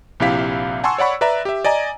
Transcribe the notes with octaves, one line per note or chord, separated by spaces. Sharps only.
A#1 C3 E4 G4 F5 B6
F#5 G#5 A5 C6 C#6 E6
C#5 D5 F#5 B5 C#6
B4 D5 E5 A#5
G4 E5
D5 D#5 G#5 A#5